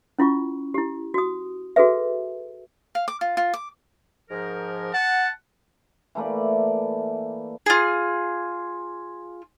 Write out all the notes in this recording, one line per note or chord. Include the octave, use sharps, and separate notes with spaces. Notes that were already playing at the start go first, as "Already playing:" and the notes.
C#4 E4 F4 C#6
E4 G4
F#4 D#6
F#4 G#4 A4 B4 E5
F5
D6
F4
F4
D6
G#2 F3 A#4
F#5 A5
E3 A3 A#3 D5
F4 G#4